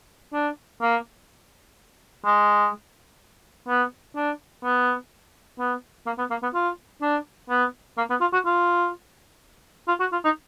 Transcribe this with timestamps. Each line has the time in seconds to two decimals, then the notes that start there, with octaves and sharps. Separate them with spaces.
0.34 D4
0.81 A#3
2.25 G#3
3.68 B3
4.16 D4
4.64 B3
5.59 B3
6.06 A#3
6.18 B3
6.31 A#3
6.43 B3
6.54 F4
7.02 D4
7.50 B3
7.98 A#3
8.10 B3
8.21 F4
8.33 F#4
8.45 F4
9.88 F4
10.00 F#4
10.13 F4
10.25 D#4